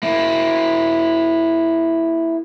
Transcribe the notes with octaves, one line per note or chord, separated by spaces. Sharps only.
A#3 E4